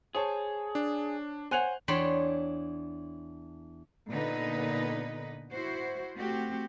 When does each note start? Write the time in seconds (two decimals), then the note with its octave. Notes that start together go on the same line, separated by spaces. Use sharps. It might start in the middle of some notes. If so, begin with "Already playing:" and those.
0.15 G#4 C5 C#5 A5
0.75 D4
1.51 C5 C#5 F#5 G#5 F#6 F7
1.88 E2 D4 C#5 G5 B5 C6
4.10 A#2 D3 B3 D#4 B4 D#5
5.51 E4 F#4 C5
6.16 A3 C4 F#4 G4